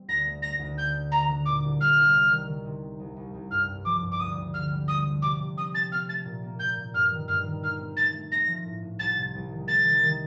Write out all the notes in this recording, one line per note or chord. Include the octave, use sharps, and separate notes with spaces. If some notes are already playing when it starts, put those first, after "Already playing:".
Already playing: G3 C4
D2 A#6
A3
A3 A#6
D2
D3 G6
D4
D3 A#5
D3
A#2 D6
C2
G3 F6
C2
C3
D#3
D#3
C3
C4
C2
C2
C2
G2 F6
G2
F3 D6
G2
D6
D2 D#6
D2
D3 F6
G3
C4 D#6
F3
C3 D6
C3
C4 D#6
C4 A6
C4 F6
A3 A6
A#2
A#3
A#2 G6
A#2
G2 F6
D#3
G2 F6
D#3
D#4 F6
C4
A3 A6
A3
A3 A#6
F3
A2
A2
C2 A6
C3
C2
D#3
A3 A6
D#3
D#3